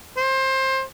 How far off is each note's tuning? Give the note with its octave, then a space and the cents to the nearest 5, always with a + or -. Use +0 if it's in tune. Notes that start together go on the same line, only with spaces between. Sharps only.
C5 +20